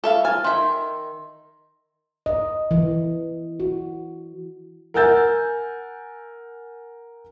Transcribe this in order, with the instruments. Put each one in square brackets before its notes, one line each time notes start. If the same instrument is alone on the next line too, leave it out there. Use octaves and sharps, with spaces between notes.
[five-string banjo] A4 E5 F5
[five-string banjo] G#5 [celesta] F6 A6
[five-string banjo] D#3 E5 [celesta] C6
[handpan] D#5
E3
F#4
[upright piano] A#4 F#5 G#5 E6 G6 A6